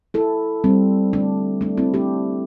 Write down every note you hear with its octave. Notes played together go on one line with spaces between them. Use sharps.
E4 A4
G3 C4
A3 D4
A3 D4
C4 E4
D4 G4